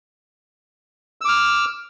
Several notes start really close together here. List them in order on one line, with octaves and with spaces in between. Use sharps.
E6 D6 F6